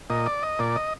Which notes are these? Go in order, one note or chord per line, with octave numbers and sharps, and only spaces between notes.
A#2 D#5
D5
D#5
A#2 D5
D#5